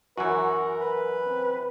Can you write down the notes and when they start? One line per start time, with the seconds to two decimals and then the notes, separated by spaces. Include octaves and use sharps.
0.18 F#2 E3 F#4 A#4
0.81 B4
1.26 C4